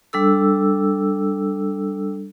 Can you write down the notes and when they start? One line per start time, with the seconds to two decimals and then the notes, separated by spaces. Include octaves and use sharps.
0.13 G3 D4 A4 E6